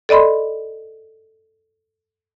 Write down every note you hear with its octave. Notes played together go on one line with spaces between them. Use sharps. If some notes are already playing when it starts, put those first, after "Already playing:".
A4 D5 D#5 B5 C6